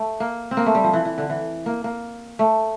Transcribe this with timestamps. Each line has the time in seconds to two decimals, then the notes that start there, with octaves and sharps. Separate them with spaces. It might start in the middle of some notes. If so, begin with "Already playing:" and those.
Already playing: A3
0.20 A#3
0.51 C4
0.57 A#3
0.66 A3
0.75 G3
0.84 F3
0.93 E3
1.05 E3
1.18 D3
1.30 E3
1.66 A#3
1.84 A#3
2.39 A3